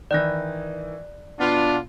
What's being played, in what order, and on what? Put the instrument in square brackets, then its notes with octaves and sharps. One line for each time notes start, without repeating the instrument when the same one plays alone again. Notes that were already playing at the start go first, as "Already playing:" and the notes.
[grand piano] D#3 E3 [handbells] D5 F#6 A#6
[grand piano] B2 [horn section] B3 F4 [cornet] D4